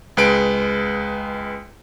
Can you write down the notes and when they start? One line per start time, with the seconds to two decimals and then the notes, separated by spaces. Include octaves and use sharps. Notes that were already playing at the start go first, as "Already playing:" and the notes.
0.17 C#2 G#3 B4 D7